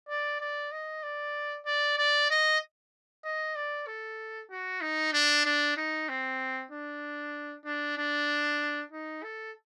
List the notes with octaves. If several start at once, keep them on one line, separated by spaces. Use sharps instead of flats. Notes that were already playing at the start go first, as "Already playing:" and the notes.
D5
D5
D#5
D5
D5
D5
D#5
D#5
D5
A4
F#4
D#4
D4
D4
D#4
C4
D4
D4
D4
D#4
A4